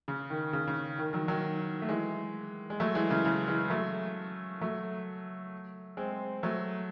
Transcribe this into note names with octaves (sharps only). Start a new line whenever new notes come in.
C#3
D#3
C#3
C#3
D#3
D#3 F#3
D#3 F#3
A3
E3 G#3
G#3
F#3 A3
E3 G#3
C#3 E3
C#3 E3
E3 G#3
F#3 A3
F#3 A3
G#3 C4
F#3 A3